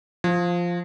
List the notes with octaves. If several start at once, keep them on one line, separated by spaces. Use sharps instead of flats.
F3